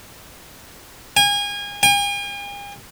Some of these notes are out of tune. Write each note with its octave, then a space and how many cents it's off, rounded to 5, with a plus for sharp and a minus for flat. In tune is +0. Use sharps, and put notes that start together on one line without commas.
G#5 -30
G#5 -45